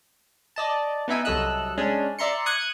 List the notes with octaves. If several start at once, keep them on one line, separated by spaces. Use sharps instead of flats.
D5 D#5 A5
B3 D#4 E4 E5 G#5
C2 F#3 A4 D#5 E6 F#6
G#3 C#4 D4
D5 E5 A#5 C6 C#7
D#6 F#6 G#6 C#7 D#7